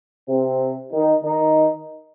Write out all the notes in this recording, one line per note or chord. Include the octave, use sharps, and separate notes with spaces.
C3 C4
D#3 D#4
D#3 D#4